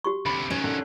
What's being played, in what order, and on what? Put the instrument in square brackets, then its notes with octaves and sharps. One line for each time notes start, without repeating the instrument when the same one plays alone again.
[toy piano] F#4 G4 C#6
[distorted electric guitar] D2 C3 [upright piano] B5
[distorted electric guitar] D#3 F#3 [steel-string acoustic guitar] C#4
[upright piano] D3